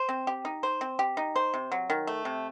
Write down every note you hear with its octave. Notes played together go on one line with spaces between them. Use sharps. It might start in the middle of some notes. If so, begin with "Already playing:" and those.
Already playing: C5
C4
G4
D#4
C5
C4
G4
D#4
C5
C3
F#3
D#3
A3
C3